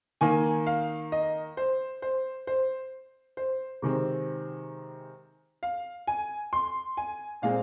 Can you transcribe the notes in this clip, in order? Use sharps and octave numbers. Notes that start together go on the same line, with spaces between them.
D#3 A#3 G#5
F5
D#5
C5
C5
C5
C5
C3 D#3 G#3 C4
F5
G#5
C6
G#5
A#2 G#3 C4 F5